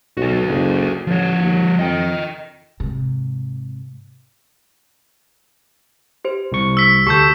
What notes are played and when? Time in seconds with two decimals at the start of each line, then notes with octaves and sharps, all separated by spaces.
0.17 B1 F#4 A4
0.48 F#1
1.07 A1 F3 C#5
1.39 D#2
1.79 F2 D#5 G5
2.80 G#2 C3
6.25 G4 C5
6.52 C2 C#6
6.77 E6 B6
7.07 D2 G4 A4 C#6 G6